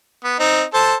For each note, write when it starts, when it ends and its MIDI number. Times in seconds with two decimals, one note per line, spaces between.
0.24 0.35 59
0.40 0.63 60
0.40 0.63 63
0.74 0.95 69
0.74 0.95 72
0.74 0.95 81